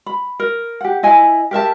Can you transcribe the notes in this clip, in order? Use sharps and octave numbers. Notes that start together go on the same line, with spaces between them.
B5
A#4
G4 F#5
E4 D#5 G#5
G4 A#4 E5 A5